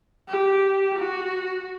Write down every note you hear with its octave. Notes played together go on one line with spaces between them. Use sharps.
G4
F#4